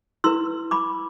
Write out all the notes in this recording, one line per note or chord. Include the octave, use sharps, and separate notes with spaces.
E4 B4 C6 E6
B5 D6